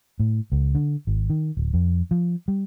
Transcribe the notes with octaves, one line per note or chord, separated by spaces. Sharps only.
A2
C#2
D3
G#1
D#3
D1
F2
F3
G3